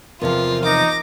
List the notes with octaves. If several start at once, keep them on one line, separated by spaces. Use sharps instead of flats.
E2 C3 F3 F4 A#4
D#4 D6 A#6